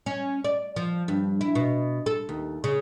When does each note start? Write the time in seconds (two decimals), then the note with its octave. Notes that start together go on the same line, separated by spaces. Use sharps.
0.06 C#4
0.45 D5
0.76 F3
1.08 G2
1.41 E4
1.55 B2
2.06 A4
2.29 D#2
2.64 C#3